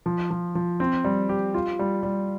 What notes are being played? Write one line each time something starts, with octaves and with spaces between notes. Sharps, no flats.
F3
F3
F3
C4
G3
G4
F4
G3
G3